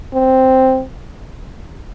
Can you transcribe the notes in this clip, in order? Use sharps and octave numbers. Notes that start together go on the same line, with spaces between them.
C4